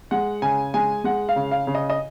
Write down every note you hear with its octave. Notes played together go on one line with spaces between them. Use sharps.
G#3 F#5
C#3 G#5
G#3 G#5
G#3 F#5
F5
C#3
F5
C#3
D#5
D#5